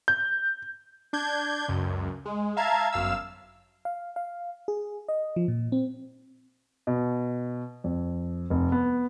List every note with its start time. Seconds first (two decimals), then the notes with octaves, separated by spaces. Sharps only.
0.08 G6
1.13 D4 G6 G#6
1.68 C#2 F#2
2.25 G#3
2.57 E5 F5 A5 A#5 G#6
2.92 G1 F#2 F5 E6
3.85 F5
4.16 F5
4.68 G#4
5.09 D#5
5.36 F3
5.48 A#2
5.72 C4
6.87 B2
7.84 F2
8.50 F1
8.72 B3